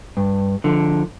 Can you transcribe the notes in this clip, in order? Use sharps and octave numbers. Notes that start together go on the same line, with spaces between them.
G2
D3 F3